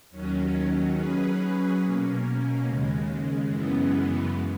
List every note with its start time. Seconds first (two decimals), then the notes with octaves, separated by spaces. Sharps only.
0.11 D#2 D#3 F#3 C#4
0.94 F#3 C#4 G#4 B4
1.78 B2 A#3 C#4
2.63 D#2 C#3 G#3
3.46 F#2 C#3 E3 G#3 B3